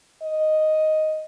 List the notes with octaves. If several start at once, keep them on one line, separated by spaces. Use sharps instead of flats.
D#5